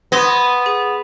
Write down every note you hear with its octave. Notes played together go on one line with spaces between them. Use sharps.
B3 C6 G#6 A#6
G#4